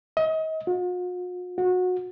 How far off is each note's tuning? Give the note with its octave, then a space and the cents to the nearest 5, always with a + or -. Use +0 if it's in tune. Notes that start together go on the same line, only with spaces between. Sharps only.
D#5 +35
F#4 -45
F#4 -20